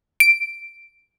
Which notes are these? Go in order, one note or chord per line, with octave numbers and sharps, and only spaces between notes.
D7